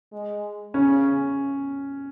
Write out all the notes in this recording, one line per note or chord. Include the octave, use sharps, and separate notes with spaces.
G#3
C#3 C#4